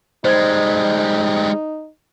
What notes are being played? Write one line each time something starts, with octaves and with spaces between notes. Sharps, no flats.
G3 G#3 D#4 C5 G#6